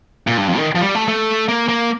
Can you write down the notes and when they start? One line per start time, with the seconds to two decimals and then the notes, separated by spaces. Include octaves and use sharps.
0.27 A#2
0.38 G2
0.48 F2
0.58 D#3
0.75 F3
0.81 G3
0.95 A3
1.08 A3
1.48 A#3
1.69 A#3